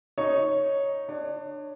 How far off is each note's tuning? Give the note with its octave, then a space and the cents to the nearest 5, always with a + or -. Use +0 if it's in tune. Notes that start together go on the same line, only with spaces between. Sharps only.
D#4 +0 C#5 +0
D4 +25 C#5 +0